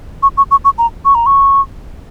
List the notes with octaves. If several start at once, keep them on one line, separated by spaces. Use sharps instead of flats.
C#6
C#6
C#6
C#6
A#5
C#6
A#5
C#6